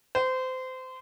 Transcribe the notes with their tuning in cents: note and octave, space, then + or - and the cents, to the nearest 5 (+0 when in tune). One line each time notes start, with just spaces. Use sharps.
C5 -25